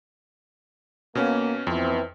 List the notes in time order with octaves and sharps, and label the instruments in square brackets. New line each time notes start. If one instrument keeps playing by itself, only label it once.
[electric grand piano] B2 C#4 [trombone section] A#3
[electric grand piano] F2 [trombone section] B2 E3 C4